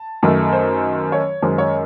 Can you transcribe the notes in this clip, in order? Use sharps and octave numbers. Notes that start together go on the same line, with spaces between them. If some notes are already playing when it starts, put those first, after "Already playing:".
Already playing: A5
F#2 D#3 A3
C5
C#5
F#2 D#3 G#3 C5
C#5